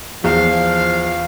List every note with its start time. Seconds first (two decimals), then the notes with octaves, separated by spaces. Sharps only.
0.24 E2 F3 F5